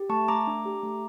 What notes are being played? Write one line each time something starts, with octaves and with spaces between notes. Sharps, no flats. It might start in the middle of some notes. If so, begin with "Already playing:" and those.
Already playing: G4
A3 A5 C#6
A3 A#5 D6
D4
G4
A3